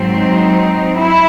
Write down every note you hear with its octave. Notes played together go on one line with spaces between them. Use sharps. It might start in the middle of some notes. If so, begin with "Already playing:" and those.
Already playing: G#2 F#3 C4
D#4
E4